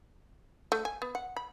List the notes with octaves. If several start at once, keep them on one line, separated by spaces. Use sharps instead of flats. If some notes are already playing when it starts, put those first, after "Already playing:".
A3
G#5
B3
F#5
B5